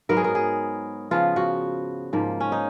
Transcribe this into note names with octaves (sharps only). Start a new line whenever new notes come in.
G#2 F#3 B3 A#4
G#4
A#4
G#4
C#3 F3 B3 F4
F#4
G#2 F3 A#3
C#4
D#4